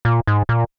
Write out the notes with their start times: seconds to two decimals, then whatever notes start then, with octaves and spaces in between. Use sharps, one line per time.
0.05 A#2
0.27 G#2
0.49 A#2